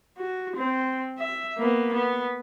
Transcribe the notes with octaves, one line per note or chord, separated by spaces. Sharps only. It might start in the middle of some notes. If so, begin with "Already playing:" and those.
F#4
C4
E5
A#3 B3
B3